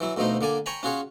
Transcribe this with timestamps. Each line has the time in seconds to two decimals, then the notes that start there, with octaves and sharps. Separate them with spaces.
0.01 E3 F#3 E4
0.17 D2 B2 F3 A3 D#4 C5
0.41 D3 A#3 D5 G#5
0.66 C#5 G5 G#5 A#5 B5
0.83 C#4 F4 F#4 G#4 C#5